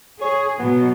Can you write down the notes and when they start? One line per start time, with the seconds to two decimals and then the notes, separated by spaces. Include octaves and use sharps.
0.21 G#4 C#5
0.59 B2 F#3 B3